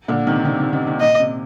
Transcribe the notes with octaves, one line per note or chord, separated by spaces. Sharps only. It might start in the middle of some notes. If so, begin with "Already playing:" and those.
A#2 D3
C3 D#3
C3 D#3
C3 D#3
C3 D#3
C3 D#3
A#2 D#5
C3